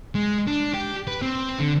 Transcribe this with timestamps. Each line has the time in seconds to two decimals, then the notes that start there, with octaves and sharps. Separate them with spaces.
0.15 G#3
0.47 D4
0.74 G4
1.07 B4
1.22 C4
1.59 D3